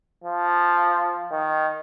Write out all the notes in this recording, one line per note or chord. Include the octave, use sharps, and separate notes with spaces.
F3
D#3